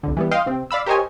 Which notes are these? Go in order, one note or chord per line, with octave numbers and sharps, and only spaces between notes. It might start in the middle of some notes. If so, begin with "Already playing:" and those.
C2 F2 D3
E3 G3 B3
D#5 F5 G5 C6
C3 C4
D5 F5 B5 E6
G4 A#4 C5 C#5 D#5 G#5